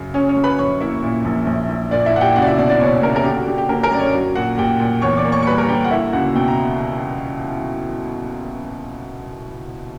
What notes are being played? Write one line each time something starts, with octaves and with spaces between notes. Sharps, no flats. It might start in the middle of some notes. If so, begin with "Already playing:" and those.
Already playing: F#2 C#3
C#3 C#4 C#5
C#4 C#5
F#2
B4 B5
A#1 C#5 C#6
A#3 E4 E5
A#2
A#1
A#1
A#1
A#2 D4 D5
E4 E5
A#2 F#5
G4 G5
C#2 F#4 F#5
D5
E4 E5
B2 D4 D5
D4 D5
B2 C#4 C#5
B2 A#3 A#4
A#4
D3 G4
F#4
D3 G4
G4
D3 A#3 A#4
A#3 A#4
F#2 D5
C#4 C#5
F#3
A#2 F#4 F#5
A#2 G4 G5
A#2
E2 C#5 C#6
D5 D6
A#3
C#5 C#6
C#6
G3 B4 B5
A#4 A#5
D3 G4 G5
F#5
A#3 E4 E5
C#2 F#4 F#5
B2 G5
A#5